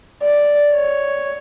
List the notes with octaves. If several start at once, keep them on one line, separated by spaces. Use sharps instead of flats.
D5
C#5